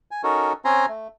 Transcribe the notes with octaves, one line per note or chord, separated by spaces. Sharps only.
G#5
C#4 D#4 F#4 A4 A#4
C4 C#4 G#5 A#5 C6
A3